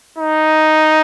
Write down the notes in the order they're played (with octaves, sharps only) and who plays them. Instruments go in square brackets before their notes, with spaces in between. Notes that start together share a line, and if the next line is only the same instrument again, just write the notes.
[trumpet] D#4